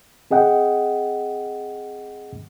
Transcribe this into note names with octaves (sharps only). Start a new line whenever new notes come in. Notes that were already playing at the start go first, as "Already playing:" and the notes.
C4 G#4 D#5 F#5 G5